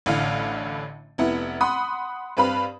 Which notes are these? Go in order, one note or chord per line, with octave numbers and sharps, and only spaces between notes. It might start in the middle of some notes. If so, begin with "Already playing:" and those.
A1 A2 D3 F5
F1 B3 E4
F#5 B5 C6 D#6
G2 C4 B4 F5 B5